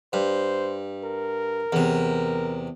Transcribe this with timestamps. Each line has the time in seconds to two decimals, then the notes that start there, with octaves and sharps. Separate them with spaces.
0.13 G2 C5
1.04 A#4
1.73 E2 C3